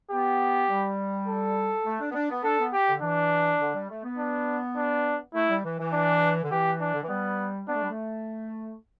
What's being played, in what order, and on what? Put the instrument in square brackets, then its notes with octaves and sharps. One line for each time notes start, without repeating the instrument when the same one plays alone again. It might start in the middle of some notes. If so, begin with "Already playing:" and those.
[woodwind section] B3 [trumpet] G4
[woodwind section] G3
[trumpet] A4
[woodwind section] A3
D4
B3
D4
B3
[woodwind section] D4 [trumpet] A4
[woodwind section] B3
[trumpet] G4
[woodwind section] D3
[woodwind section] E3 [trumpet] D4
[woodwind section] D3
G3
A3
B3
[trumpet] D4
D4
[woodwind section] A3 [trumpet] E4
[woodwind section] G3
E3
E3
[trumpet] D4
[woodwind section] D3
[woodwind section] E3 [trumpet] G4
[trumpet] D4
[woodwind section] D3
E3
[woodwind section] G3 [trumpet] B3
[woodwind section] B3 [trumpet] D4
[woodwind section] A3
G3
A3